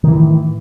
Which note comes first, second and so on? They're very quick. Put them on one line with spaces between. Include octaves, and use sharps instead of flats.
D#3 E3 A2